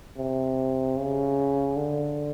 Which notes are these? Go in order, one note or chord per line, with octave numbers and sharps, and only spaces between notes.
C3
C#3
D3